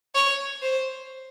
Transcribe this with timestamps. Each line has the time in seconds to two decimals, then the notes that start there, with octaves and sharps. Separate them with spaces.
0.15 C#5
0.62 C5